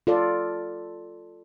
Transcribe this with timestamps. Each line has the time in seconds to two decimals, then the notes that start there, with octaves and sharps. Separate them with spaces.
0.07 F4 A4 D5